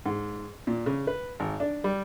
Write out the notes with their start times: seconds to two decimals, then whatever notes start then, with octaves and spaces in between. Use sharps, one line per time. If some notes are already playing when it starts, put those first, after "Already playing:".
0.06 G#2
0.67 A#2
0.86 C#3
1.07 B4
1.40 G#1
1.60 D4
1.84 G3